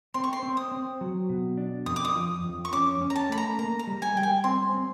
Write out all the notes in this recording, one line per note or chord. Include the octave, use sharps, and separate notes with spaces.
C4 C6
C#6
C6
C4
D#6
C4
F#3
B2
D4
F2 D#6
D6
D#6
F3
F2
C#6
C#4 D6
C#4
A#5
A5
A3 B5
A#5
A#3 A#5
A#5
G3
G#5
G3 G5
G#5
C4 C6
C4